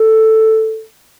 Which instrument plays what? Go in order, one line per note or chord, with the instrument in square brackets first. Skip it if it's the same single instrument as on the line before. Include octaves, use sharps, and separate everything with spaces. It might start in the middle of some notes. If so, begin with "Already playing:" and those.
Already playing: [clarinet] A4